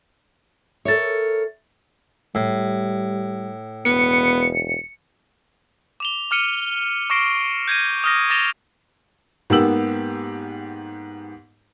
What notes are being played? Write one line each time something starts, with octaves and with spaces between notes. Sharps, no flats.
A4 A#4 C#5 E5 A6
A2 G3
E1 B3 C#7
D6 F7 G7
D6 F6 C#7 D#7
C#6 D6 F6 A#6 C7 D7
G6 G#6 A#6 D#7
D#6 F6 A#6
D6 A6 A#6 E7 F7 G7
G#2 A#3 B3 G4 E6 F#7